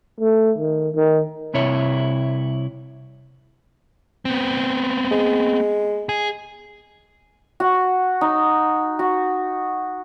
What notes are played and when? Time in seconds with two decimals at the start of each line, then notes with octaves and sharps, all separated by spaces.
0.20 A3
0.58 D#3
0.95 D#3
1.54 C2 C3 E4 C#5
4.25 B3 C4
5.11 G#3
6.09 G#4
7.60 F#4
8.21 D#4
8.99 F#4